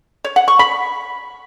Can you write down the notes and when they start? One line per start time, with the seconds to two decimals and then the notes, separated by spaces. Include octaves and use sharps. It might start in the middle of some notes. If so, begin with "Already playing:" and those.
0.24 C#5
0.36 F#5
0.48 C#6
0.59 B5